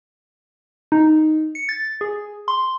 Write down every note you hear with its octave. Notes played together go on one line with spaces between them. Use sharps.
D#4
C#7
A6
G#4
C6